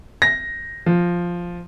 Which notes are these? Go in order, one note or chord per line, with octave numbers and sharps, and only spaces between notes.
A#6
F3